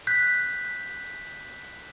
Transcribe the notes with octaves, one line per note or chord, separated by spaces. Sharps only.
F#6 G6 B6